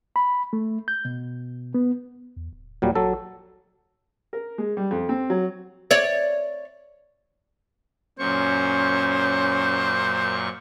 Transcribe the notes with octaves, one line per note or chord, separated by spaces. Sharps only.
B5
A3
G6
B2
B3
E2
D1
D#2 A#2 F#3 G3
A1 F#3 A4
A#4
G#3
G3
F2
C4
F#3
C#5 D5
F#2 A#2 C#4 C5 C#6